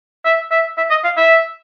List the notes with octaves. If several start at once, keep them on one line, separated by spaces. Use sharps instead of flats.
E5
E5
E5
D#5
F5
E5